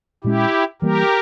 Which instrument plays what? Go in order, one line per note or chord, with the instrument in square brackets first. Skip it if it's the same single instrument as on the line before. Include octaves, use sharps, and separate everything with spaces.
[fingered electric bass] A#2 G#3 C#4 [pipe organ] E4 G4
[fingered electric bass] E3 G3 A#3 [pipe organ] G4 A#4